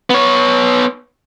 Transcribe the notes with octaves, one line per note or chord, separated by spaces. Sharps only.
B3 C#5